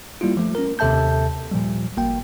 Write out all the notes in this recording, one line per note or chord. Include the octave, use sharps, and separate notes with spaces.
G3 A#3 E4 F4
F3 A3
C#4 A#4
D#2 C3 A4 E5 A5 G6
A#2 F3 G3
G#1 A#3 G5